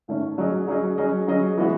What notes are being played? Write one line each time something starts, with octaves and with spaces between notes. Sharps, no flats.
G#2 D#3 A3 C#4
F#3 C#4 G#4 D#5
F#3 C#4 G#4 D#5
F#3 C#4 G#4 D#5
F#3 C#4 G#4 D#5
E3 G#3 B3 F#4